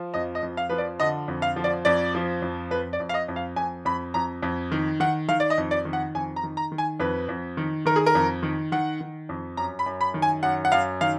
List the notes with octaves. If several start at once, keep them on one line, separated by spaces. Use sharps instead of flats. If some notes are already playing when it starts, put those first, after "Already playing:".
Already playing: F3
F2 D#5
D#5
F2
F5
F3 B4
D5
D3 D#5
F2
F5
F3
D5
F2 D5
F3
F2
F2 B4
D5
F2
F5
D#5
F2
F5
F2 G#5
F2 B5
F2 A#5
F2
D#3
D#3 F#5
D#3 F5
D5
D#5
F2
D5
D#3
F#5
F2 G#5
A#5
D#3
A#5
D#3
G#5
F2 B4
F2
D#3
D#3 A#4
G#4
A#4
F2
D#3
D#3 F#5
D#3
F2
F#2 A#5
B5
F#2
B5
D#3
G#5
F#2 F#5
F#5
F#2 F5
D#3 F5